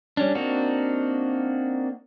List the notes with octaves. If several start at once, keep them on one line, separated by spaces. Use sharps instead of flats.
G3 C#4 D4
A#3 C4 D4 D#4 F#4